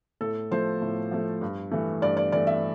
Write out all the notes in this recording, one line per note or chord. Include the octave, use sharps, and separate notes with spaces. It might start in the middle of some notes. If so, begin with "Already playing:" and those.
A2 A4
F3 A3 C5
A2
F3 A3
G2
E3 A3
G2 D5
D5
E3 A3 D5
E5